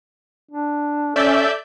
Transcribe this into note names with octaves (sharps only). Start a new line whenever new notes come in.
D4
C#4 A4 D5 E5 G6